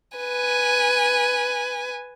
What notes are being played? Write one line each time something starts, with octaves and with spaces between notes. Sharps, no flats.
B4 G#5